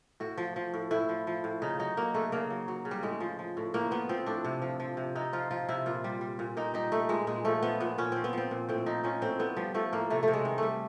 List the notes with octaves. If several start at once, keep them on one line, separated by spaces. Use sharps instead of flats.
A2 F#4
F3
F3
A2
A2 E4
F3
F3
A2
C#3 D#4
F#3 D#4
F#3 A#3
C#3 A3
C#3 A#3
F#3
F#3
C#3
G3
A2 G#3
F3
F3
A2
A2 A#3
F3 B3
F3 C4
A2 D4
C3
F3
F3
C3
C3 D#4
F3 F4
F3 F4
C3 E4
A#2 F4
G3
G3
A#2
A#2 D#4
G3 D#4
G3 A3
A#2 G#3
A#2 G#3
F3 A3
F3 B3
A#2 B3
A#2 C#4
F3 C4
B3
F3 C4
A#2
A2 C4
F3 D#4
F3 C#4
A2 C4
A2 B3
F3 G3
F3 A3
A2 A#3
C3 A3
C3 A3
G#3
D#3
G3 A3